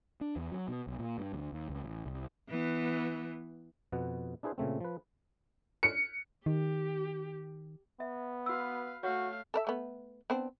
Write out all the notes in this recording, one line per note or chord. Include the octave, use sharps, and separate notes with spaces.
D4
E2
F#3
B2
B1
A#2
G2
D2
D#2
C#2
A1
C2
E3 B3
F2 B2 B3 F#5
D4 E4 G#4 B4 C5
A#2 C#3 A3 C4
F3 B4
C#7
D#3 G4
B3 E5
F#4 B4 F5 E6
A3 F#4 C#5 F5
A4 A#4 E5
A3 B3
B3 C4 D4